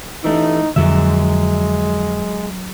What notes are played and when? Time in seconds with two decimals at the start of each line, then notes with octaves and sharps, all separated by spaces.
0.24 E3 A3 D#4
0.76 F2 D3 F#3 G#3 E5